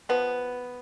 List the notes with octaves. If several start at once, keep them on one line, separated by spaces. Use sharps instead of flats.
F3 B3